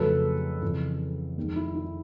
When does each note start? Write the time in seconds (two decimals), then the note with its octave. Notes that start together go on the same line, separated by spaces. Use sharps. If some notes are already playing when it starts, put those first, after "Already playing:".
Already playing: F2 C#3 F#3 A3 A4 B4
0.62 F2 C#3 E3
1.37 F1 D#2 D#3 G#3
1.56 E4
1.75 E4